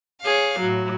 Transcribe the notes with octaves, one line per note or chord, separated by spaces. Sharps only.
G#4 C#5 F5
A2 F#3